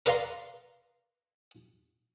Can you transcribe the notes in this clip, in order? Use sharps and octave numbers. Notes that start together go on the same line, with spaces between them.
A#4 B4 D5 F5 A#5 C6